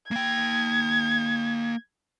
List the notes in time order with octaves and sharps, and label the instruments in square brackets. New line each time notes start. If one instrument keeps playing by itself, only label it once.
[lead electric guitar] A#3 G5 [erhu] G#6